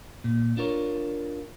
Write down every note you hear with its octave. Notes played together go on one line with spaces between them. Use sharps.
A#2
D4 F4 A#4 C#5